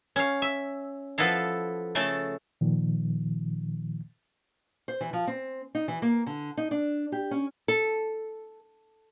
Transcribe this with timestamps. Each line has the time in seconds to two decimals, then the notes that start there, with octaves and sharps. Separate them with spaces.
0.16 C#4 F5
0.42 E5
1.18 F3 B3 E4 A4 F5
1.95 C#3 A3 A5
2.61 A#2 D#3 F3
4.88 C5
5.01 E3
5.13 F3
5.27 C4
5.75 D#4
5.88 E3
6.02 A#3
6.26 D3
6.57 D#4
6.71 D4
7.12 G4
7.31 C#4
7.68 A4